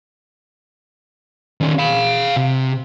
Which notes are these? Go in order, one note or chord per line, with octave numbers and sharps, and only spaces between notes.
D#3 C#4
F5 B5
C3